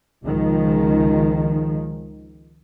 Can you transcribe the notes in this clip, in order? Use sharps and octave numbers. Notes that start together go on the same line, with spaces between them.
C#2 D#3 F3 G#3